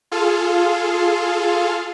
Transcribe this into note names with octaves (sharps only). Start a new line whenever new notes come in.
F4 G#4 A4 F5